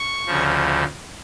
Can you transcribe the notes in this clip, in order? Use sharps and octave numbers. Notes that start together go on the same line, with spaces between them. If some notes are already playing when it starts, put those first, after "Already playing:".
Already playing: C#6
D2 C#3 F3